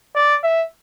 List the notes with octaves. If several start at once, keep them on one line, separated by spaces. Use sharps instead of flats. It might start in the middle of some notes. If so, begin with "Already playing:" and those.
D5
E5